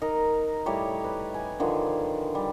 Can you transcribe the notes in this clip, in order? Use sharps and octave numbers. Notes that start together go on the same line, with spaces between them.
D#4 A#4 D#5
A2 G3 G4 C#5
B4
G#5
D3 D#3 F3
G3